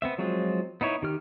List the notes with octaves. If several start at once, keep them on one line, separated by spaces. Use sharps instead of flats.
B3 C4 E5
F3 F#3 G#3 C4 F4
B3 D#4 E4 C#5
D#3 G4 F6